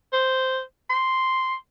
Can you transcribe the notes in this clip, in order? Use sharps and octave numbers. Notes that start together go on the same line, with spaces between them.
C5
C6